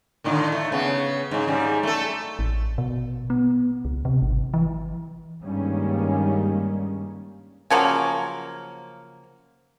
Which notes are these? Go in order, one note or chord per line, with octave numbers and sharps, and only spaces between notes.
A2 D3 D#3
A3
C#3 B3
G#2 C#3
G#2 G3
A3 A4
A1
B2
B3
C#2
C3
G#1
E3
G2 D#3 G3 G#3 A#3 C#4
C#3 F3 F#3 A#3